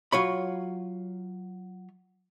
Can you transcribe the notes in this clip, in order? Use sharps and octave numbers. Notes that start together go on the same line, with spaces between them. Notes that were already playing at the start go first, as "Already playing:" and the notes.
F#3 F4 C#5 B5